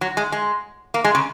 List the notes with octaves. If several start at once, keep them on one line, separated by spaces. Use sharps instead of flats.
F#3
G#3
G#3
A#3
G#3
C#3